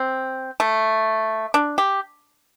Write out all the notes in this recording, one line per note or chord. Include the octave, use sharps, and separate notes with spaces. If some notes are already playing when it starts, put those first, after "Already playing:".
Already playing: C4
A3
D4
G4